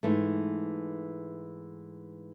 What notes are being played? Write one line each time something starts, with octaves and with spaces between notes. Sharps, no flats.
G#2 E3 A3